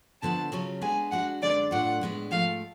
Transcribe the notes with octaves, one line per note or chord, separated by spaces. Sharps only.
D2 D3 F3 B3 D4 A5
C#3 F#3 C#4 F4
G#3 B3 D4 G#5
G#3 D4 F#4 F#5
F#2 D3 G#3 D4 D5
A2 F#3 A3 D4 F4 F#5
A2 G#3 B3 D4
G#2 F3 A3 F5